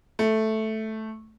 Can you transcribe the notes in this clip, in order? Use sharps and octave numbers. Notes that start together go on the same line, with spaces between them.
A3